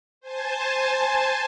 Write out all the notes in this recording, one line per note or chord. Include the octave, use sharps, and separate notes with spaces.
C5 G#5 A5